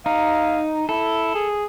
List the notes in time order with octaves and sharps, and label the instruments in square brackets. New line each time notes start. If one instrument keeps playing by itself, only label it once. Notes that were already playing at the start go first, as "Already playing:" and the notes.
[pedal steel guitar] D#4 [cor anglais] F5
[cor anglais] E4 [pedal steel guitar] A4
[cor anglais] G#4